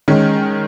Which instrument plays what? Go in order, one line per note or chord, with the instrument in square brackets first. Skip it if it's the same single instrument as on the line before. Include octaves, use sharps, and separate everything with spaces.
[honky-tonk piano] D#3 G#3 C#4